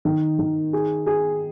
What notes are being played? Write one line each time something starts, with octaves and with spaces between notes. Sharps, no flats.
D#3
D#3
G#4
G#4